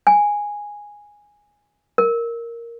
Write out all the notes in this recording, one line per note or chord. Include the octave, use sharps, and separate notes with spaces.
G#5
A#4